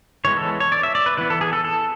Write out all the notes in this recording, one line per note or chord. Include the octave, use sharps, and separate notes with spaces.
E3 G#3 B3 C#5
A4
C#5
D5
E5
D5
B4
E3 B3 B4
A4
G#4
A4
A4